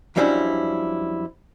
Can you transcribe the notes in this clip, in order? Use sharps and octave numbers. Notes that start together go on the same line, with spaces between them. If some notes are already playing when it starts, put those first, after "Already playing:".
F2 F#3 G3 C#4 D4 E4